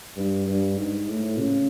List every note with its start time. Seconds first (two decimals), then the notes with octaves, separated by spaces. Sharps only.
0.16 G2
0.47 G2
0.76 G#2
1.08 A2
1.39 C#3